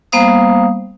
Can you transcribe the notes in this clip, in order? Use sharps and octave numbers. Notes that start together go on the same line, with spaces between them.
G3 A#3 B3 C5 F5 D#6